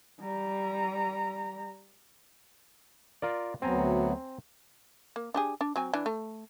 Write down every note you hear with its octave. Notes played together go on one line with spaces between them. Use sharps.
G3 A#5
F4 A#4 D5
D2 F#3 B3 C4 G#5 A#5
A#3
D4 G4 G#4
D4
F#3 C4 G#5
E3 D4
A3